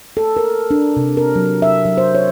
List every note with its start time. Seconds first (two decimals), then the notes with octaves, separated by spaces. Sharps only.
0.17 A4
0.37 A#4
0.71 D4
0.97 C3
1.17 A#4
1.36 F#3
1.62 E5
1.85 F#3
1.98 C5
2.15 C#5